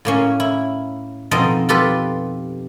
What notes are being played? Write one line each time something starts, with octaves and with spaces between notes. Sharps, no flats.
A2 A#3 C#4
E4
F2 B2 C4 D#4 D#5 A5
F4 G4 A4 B4